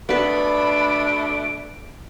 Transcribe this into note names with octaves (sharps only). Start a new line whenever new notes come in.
B2 A3 B3 D4 B4 B5 D7